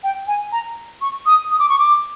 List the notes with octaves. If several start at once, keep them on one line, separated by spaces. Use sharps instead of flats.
G5
G#5
A#5
C#6
D#6
D#6
D6
C#6
D6